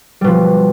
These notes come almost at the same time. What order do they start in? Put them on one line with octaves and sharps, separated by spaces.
G3 B2 F3